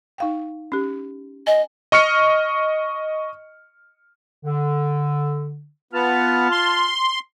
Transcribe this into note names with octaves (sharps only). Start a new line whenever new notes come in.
D#4 F5 G5
C#4 G4
D#5 G#5
D#5 C#6 F6 C#7
D3
B3 F4 A5 F6
C6